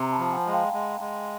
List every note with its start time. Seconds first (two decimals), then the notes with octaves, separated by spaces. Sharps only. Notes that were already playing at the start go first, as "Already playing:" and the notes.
Already playing: C3 A#5 C6
0.12 A5 B5
0.19 F3
0.32 F#5 G#5
0.46 G#3
0.53 F5 G5
0.73 G#3
1.00 G#3